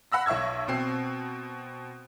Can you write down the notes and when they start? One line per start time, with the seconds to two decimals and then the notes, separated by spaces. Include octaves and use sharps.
0.12 F#5 B5 E6 A#6
0.26 B1 E5 C#6 E6 G#6
0.68 B2 C4 C7